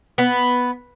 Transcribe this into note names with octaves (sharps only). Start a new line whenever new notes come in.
B3